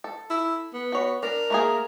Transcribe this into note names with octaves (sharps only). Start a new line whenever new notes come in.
A4
E4
B3
F#4 C#5 B5
D4 A#4
A3 A#3 G#4